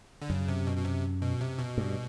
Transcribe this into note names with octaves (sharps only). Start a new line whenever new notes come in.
D3
F#2 C#3
C3
B2
B2
C3
B2
C3
B2
G2